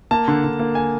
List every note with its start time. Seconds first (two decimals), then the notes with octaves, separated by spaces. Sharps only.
0.11 A#3 A5
0.28 D3
0.44 D3
0.59 A#3
0.75 G#5